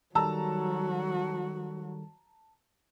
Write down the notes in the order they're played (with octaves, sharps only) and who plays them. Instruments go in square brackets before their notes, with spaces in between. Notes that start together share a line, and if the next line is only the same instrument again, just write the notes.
[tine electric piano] D#3 G3 A4 [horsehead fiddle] F#3 F#4 [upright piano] A5 A#5 E6